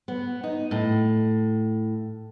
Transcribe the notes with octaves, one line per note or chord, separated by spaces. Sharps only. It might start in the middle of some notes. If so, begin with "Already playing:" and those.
B3
D#4
A2